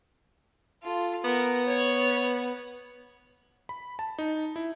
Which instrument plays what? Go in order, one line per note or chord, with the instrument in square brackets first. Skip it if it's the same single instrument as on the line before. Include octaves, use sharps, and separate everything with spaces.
[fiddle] F4 A4
[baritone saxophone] B3 [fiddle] A#4
[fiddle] C#5
[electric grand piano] B5
A5
D#4
E4